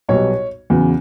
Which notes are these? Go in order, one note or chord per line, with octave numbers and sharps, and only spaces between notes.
B1 B2 G3 C#5
E2 C#3 F#3